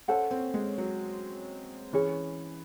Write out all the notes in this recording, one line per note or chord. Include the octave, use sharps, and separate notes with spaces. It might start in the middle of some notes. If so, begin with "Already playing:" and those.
C#4 A4 C5 F#5 A5
C4
G#3
F#3
E3 C#4 G#4 C#5